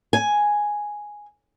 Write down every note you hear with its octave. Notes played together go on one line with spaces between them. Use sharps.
G#5